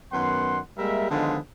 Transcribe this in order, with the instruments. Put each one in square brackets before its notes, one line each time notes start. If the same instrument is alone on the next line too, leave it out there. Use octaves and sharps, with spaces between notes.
[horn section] F#2 D#3 B3 F#5 C6
G3 G#3 A#3 A#4 E5
D3 D#3 F3 G#3 B3 F4